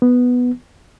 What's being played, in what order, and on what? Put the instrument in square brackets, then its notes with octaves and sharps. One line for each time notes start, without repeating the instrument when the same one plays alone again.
[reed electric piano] B3